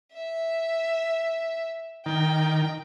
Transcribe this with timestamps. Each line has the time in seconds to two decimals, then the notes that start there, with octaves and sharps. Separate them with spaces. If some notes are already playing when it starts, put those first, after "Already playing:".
0.13 E5
2.06 D#3 G5